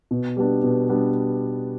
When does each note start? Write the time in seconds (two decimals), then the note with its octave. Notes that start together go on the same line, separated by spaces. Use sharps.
0.11 B2
0.37 G3 B3 D4
0.63 B2
0.89 G3 B3 D4